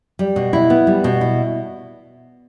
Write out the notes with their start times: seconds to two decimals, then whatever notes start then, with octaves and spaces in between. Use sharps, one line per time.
0.19 G3
0.36 B2
0.53 E4
0.70 B3
0.87 G3
1.04 B2
1.21 E4